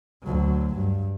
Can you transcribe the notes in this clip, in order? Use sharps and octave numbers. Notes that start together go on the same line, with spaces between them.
D2 F#3
G2